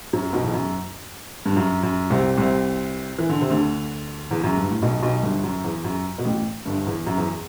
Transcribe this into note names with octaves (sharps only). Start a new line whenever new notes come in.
F#2 F#3
B1 B2
E2
F#2
G2
F#2
F#2
C2 C3
C2 C3
E3
D3
C3
D2 D3
E2
F#2
G2
A2
B1 B2
B1 B2
G1 G2
F#2
E2
F#2
B2
A1 A2
G1 G2
E2
F#2
E2